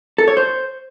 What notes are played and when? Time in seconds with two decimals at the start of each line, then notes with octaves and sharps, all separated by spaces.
0.18 A4
0.28 C#5
0.37 C5